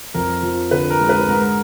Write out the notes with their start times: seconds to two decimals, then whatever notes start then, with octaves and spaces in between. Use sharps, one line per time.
0.14 F2 A#4
0.43 F3
0.71 D3 B4
0.90 A#4
1.00 G#3
1.09 B4
1.28 G#2 A#4